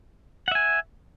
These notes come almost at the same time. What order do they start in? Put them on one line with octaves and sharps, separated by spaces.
F#5 E5 G#5